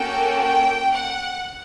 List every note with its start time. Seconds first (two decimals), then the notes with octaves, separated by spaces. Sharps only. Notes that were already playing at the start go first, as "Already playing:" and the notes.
Already playing: A#3 C#4 F#4 A4 G5
0.43 G5
0.93 F#5